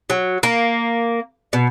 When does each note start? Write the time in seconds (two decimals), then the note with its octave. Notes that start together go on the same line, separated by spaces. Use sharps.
0.10 F#3
0.43 A#3
1.53 B2